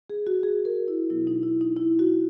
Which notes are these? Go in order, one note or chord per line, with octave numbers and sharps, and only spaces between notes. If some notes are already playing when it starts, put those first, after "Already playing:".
G#4
F#4
G#4
A#4
E4
B2 F#3 B3 E4
D#4
E4
D#4
E4
F#4